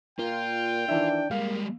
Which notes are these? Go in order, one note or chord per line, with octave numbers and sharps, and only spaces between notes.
A#2 A#3 F4 G5
D#3 E3 D4 E5
G3 G#3 A#3 F5